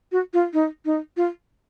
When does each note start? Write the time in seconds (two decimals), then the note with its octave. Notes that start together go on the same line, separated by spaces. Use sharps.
0.12 F#4
0.34 F4
0.53 D#4
0.85 D#4
1.17 F4